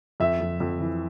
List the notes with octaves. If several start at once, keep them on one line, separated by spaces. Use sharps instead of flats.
F2 E5
F2
F2
E3